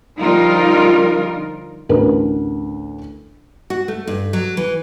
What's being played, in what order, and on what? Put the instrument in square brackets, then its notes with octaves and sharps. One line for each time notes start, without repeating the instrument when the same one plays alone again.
[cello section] D3 F3 G3 D#4 F4 A#4
[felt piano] A1 D2 D4 A#4 B4
[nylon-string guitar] F#4
A3
G2
F#3
E3